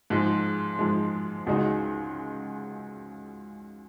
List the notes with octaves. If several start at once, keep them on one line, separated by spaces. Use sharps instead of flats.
G#2 F3 G#3
G#2 F3 G#3
C#2 C#3 G#3 D#4 F#4